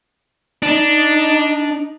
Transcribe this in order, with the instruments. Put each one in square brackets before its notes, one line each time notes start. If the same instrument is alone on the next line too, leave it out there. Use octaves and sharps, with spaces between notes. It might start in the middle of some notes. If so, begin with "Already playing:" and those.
[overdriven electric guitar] D4 [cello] D#4